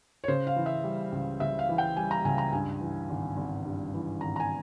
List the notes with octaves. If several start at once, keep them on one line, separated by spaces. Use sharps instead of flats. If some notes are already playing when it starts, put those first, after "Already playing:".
C#5
C#3 C5
F5
E3
E5
G3
C#2
C#3 E5
F5
E3
G5
G3 G#5
A#5
C#2 G#5
A#5
G2 G#5
E3
G#1
G#1
G2
E3
G#1 A#5
A#5
G#5